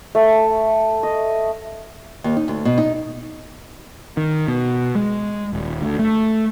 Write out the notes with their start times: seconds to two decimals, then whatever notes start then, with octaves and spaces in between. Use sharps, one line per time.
0.15 A3
1.03 D#5
2.24 D#2
2.37 D#4
2.48 D2
2.65 B2
2.78 D#4
4.17 D#3
4.48 B2
4.95 G#3
5.53 D#1
5.82 D2
5.99 A3